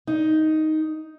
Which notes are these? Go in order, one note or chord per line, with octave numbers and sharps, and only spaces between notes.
D#4